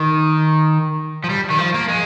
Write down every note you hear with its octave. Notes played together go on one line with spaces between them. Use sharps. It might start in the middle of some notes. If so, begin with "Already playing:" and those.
Already playing: D#3
F3
G3
D#3
F3
A#3
G#3